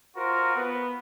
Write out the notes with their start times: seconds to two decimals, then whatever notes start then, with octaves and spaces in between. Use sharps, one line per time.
0.15 F4 F#4 A#4 C5
0.56 B3